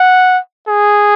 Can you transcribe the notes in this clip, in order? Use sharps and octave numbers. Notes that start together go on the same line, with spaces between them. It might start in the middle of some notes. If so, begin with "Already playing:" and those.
Already playing: F#5
G#4